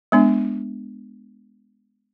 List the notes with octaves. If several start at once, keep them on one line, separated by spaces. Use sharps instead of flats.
G#3 B3 D4